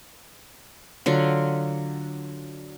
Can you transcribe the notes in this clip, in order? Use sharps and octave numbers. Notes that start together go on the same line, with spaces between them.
D3 F#3 F4